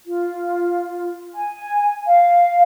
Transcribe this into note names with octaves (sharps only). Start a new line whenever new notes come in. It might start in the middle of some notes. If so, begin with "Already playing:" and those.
F4
G#5
F5